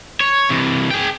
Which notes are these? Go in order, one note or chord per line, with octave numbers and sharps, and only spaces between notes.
C#5
C3 E3
G#4 G5